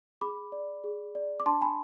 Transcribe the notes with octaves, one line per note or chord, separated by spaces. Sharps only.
G#4 B5 D6
D5
G#4
D5
D6
D4 A5 C6
G#5 B5